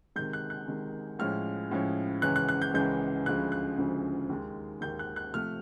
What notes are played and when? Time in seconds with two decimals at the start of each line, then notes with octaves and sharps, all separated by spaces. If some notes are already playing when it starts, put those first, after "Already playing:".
0.16 C3 D#3 G#3 G6
0.33 F#6
0.50 F#6
0.67 C3 D#3 G#3
1.19 A2 F3 G#3 C#4 F6
1.71 A2 F3 G#3 C#4
2.22 C#2 C#3 E3 G#3 C#4 F#6
2.36 F#6
2.49 F#6
2.62 G6
2.74 C#2 C#3 E3 G#3 C#4 G6
3.26 D2 C#3 F3 G#3 F#6
3.52 F#6
3.78 D2 C#3 F3 G#3
4.30 D#2 D#3 G#3
4.81 D#2 D#3 G#3 G6
4.99 F#6
5.16 F#6
5.33 C3 F3 A3 F6